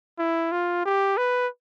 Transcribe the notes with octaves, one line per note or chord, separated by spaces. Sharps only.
E4
F4
G4
B4